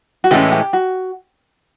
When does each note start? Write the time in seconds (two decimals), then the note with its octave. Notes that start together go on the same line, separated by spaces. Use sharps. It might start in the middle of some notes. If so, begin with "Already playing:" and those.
0.24 F#4
0.31 A2 E3 G#3 C#4 G4
0.52 G4
0.73 F#4